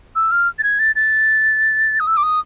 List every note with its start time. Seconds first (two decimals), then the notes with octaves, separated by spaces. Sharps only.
0.15 E6
0.31 F6
0.59 A6
0.63 G#6
0.79 A6
0.95 A6
2.00 D#6
2.07 E6
2.17 D6
2.23 D#6